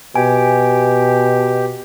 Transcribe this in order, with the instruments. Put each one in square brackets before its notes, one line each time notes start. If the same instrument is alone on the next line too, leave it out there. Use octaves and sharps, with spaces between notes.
[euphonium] B2 [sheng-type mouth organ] G4 [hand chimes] G#5